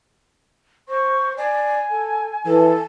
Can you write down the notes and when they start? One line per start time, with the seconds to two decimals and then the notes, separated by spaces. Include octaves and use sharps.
0.89 C5 C#6
1.37 D5 G#5
1.90 A4
2.46 E3 A4